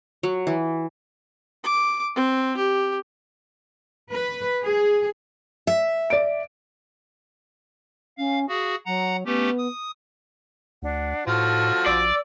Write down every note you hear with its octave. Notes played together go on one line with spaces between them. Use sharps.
F#3
E3
D6
C4
G4
B4
G#4
E5
D5 D7
C#4 F5
F#4 G#4 F5
F#3 F#5 A#5
A3 B3 C#4 G4
D#6
D2 D4 F#5
A2 F3 F#4 A4 C#6 F6
A#1 D5 E6